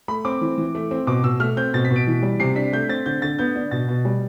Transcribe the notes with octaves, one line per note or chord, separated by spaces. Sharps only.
A3 B5
C4 D6
E3
E3
A3
C4
B2 D6
B2 E6
A3 F6
C4 G6
B2 A6
B6
B2
D7
E3
G3
C3 C7
D4 B6
A3 G6
C4 A6
D3 G6
D3 A6
B3 G6
D4
B2 A6
B2
G3